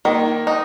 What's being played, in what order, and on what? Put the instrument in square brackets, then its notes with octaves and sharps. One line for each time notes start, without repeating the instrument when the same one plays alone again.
[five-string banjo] D#3 [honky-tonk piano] A#3
[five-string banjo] D#4